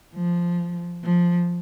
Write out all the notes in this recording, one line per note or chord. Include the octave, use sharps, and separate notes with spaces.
F3
F3